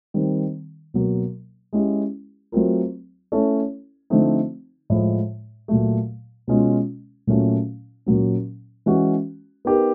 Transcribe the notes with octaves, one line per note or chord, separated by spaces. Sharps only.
D#3 G3 C4
B2 F#3 A#3
G#3 C#4 E4 G4
F#3 A3 C4 F4 A#4
A3 C#4 E4 A4 C#5
D3 F3 A3 C4 D#4
A2 F3 G#3
A#2 F#3 A3
B2 G#3 C#4 F4
A#2 F#3 A3 C#4 F4
A#2 F#3 A#3 C#4
E3 G#3 C#4 F#4
B3 D#4 G4 A#4